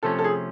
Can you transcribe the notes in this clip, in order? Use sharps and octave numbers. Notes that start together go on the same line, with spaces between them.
C3 F3 A3 C#4 A4
A4
G#4